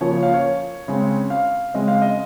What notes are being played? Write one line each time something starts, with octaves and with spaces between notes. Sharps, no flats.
C#3 F3 A#3 C#5
C#5
F5
C#5
C#3 G#3 C4
F5
C#3 G#3 C4 D#5
F5
D#5